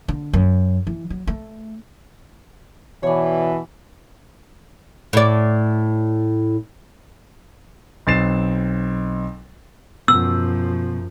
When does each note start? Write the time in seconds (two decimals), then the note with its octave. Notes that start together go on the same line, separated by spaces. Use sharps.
0.08 D3
0.33 F#2
0.87 E3
1.10 F#3
1.27 A3
3.03 B2 E3 C#5 D5
5.13 A2 D5
8.07 B1 C4 A6 C7 E7
10.08 F#2 B2 F3 B3 E6